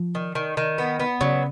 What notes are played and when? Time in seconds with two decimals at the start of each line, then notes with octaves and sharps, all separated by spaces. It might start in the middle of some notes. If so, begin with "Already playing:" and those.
Already playing: F3
0.15 D#3
0.35 D#3
0.57 D#3
0.78 B3
1.00 B3
1.21 C#3 F#3